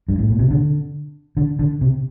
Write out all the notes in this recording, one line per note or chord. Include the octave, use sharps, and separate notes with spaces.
G2
A2
A#2
C3
D3
D3
D3
C3